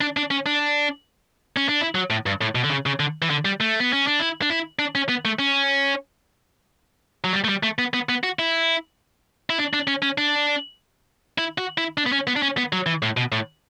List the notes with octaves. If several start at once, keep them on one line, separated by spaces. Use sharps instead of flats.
D4
D4
C#4
D4
C#4
D4
E4
F#3
A2
G2
A2
B2
D3
C#3
C#3
D3
E3
D3
G3
A3
B3
C#4
D4
E4
D4
E4
D4
C#4
B3
A3
C#4
F#3
G3
A3
G3
A3
B3
B3
B3
F#4
E4
E4
D4
D4
C#4
C#4
D4
E4
F#4
E4
D4
B3
C#4
B3
D4
C#4
B3
F#3
E3
A2
B2
A2